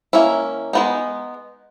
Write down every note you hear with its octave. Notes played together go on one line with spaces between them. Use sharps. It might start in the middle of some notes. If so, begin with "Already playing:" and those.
D#3 A#3 C#4 E4
G#3 B3 D#4